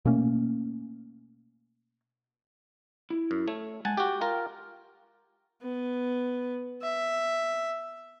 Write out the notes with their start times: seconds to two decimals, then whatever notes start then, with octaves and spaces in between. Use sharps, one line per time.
0.05 B2 A3 A#3 C#4
3.10 E4
3.31 F#2
3.48 A3 C#5
3.85 G#3 F#5 G#5 A5
3.97 F#4 G4 G5
4.21 F4 A#4
5.62 B3
6.82 E5